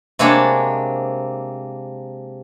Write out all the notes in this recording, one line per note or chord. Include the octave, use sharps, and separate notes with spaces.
C3 G#3 A#3 D4 C#5 A5